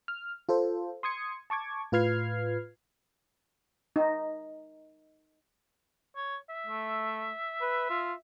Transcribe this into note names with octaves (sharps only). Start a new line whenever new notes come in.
F6
F4 A4 C5
C6 D#6 G#6 C#7
A5 C#6 D6 G#6
A2 F4 B4 F6 G#6 C7
D#4
C#5
E5
A3
B4
F4